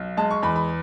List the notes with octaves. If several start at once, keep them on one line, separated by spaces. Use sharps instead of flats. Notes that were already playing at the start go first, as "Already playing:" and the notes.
Already playing: B1
G#3 A5
C#6
E2 B5
B5